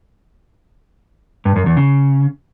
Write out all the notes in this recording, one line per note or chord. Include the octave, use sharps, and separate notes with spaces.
G2
F#2
E2
C#3